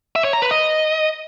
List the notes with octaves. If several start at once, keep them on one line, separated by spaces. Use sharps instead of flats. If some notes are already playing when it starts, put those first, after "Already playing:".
E5
C#5
A#5
B4
D#5